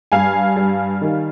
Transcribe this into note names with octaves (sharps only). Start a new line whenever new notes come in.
G2 F5 G#5
G3
D#3